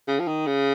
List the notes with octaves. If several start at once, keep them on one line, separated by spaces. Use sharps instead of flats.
C#3
F3
D#3
C#3